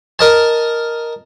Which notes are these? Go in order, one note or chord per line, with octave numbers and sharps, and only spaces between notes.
A#4 D#5 A5